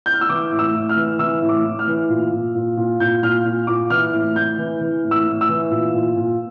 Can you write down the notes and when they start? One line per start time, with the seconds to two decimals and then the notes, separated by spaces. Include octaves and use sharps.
0.06 G6
0.13 F6
0.21 E6
0.29 E3 D6
0.51 A2
0.59 E6
0.75 A2
0.89 F6
0.96 E3
1.19 E3 E6
1.42 A2
1.49 D6
1.65 A2
1.79 F6
1.87 E3
2.09 A#2
2.32 A#2
2.55 A#2
2.77 A#2
3.00 A#2 G6
3.23 A#2 F6
3.45 A#2
3.67 A#2 D6
3.90 E3 F6
4.13 A2
4.35 A2 G6
4.58 E3
4.81 E3
5.04 A2
5.11 E6
5.27 A2
5.41 E6
5.49 E3
5.71 A#2
5.94 A#2
6.16 A#2